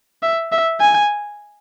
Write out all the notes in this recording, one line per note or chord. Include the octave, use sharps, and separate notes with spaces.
E5
E5
G#5